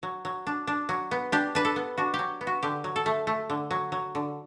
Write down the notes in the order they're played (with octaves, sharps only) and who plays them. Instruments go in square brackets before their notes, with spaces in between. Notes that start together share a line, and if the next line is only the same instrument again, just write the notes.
[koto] F#3
F#3
D4
D4
F#3
B3
D4 G4
D4 B4
A4
B3
D4 F#4
G4
F#3
B3
F#4
D3 G4
F#3
A4
A3
A3
D3
F#3
F#3
D3